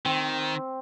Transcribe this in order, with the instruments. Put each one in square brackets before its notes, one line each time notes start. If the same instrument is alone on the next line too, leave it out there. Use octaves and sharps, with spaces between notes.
[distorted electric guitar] D#3 [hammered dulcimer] C4